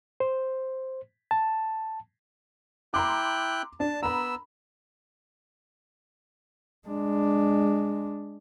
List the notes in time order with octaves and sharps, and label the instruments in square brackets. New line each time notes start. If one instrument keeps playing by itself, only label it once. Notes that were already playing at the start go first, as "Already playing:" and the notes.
[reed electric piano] C5
A5
[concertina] E4 G5 F#6 [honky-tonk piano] A#5 C6 D6
[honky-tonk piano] D4 [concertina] A5
[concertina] B3 E6 [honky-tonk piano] A#5 B5
[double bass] G#3 D4